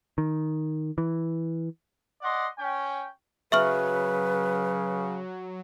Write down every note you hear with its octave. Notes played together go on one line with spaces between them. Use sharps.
D#3
E3
D5 D#5 F#5 C6
C#4 G5
C#3 F#3 B4 E5 C#6 F6